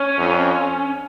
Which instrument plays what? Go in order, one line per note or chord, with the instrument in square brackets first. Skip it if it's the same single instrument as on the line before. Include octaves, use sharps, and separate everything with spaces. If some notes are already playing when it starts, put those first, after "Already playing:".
Already playing: [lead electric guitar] C#4
[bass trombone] F2